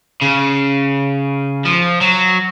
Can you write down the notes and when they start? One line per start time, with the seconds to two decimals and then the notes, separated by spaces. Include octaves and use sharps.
0.22 C#3
1.65 F3
2.01 F#3